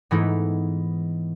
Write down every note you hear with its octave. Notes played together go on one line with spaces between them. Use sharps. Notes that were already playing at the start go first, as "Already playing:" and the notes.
G#2 E3 A3 B3 D#4 E4